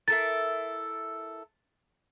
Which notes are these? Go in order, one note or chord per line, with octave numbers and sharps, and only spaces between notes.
E4 A4 A#4 A6